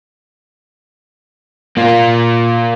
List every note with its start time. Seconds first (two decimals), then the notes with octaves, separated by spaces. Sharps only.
1.77 A#3 F4